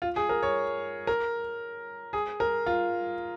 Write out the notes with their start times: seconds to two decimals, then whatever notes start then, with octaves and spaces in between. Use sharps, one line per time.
0.02 F4
0.16 G#4
0.29 A#4
0.43 C#5
1.07 A#4
2.13 G#4
2.40 A#4
2.66 F4